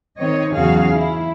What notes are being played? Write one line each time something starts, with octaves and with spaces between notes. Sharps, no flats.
D#3 C4 C#5 D#5
E2 C#3 F#3 F#4 G#4 F5
E4